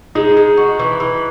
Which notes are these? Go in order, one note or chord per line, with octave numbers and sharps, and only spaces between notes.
G#3 D#4
G#3
F#4
E3
E3